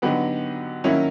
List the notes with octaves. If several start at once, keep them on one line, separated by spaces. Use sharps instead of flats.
D3 F#3 B3 D#4 G4
D#3 F#3 A#3 C#4 E4